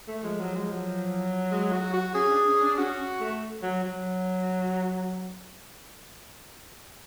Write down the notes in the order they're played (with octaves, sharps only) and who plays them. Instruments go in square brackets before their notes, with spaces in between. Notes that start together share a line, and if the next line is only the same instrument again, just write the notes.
[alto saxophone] A3
[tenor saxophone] F3 [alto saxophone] G#3
[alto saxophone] F#3
G#3
F#3
[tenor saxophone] G#3
F#4
F#4
[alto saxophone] C#4 [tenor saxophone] G#4
[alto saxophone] D4
C#4
D4
[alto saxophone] C#4 [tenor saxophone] F#4
[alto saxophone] A3
F#3
F#3